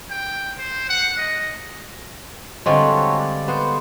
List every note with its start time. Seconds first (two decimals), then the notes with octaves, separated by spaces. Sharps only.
0.10 G5
0.58 C5
0.89 F#5
1.18 D#5
2.66 D3 G3 G#3 C4 F4 F#4 A4 C#5
3.19 D5
3.48 B3 C5